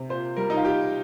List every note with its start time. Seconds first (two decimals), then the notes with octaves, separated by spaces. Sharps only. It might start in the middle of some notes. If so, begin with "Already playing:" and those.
Already playing: C3
0.09 A#2 C5
0.36 G3 A#4
0.50 D#4
0.57 F4
0.65 A#2 G4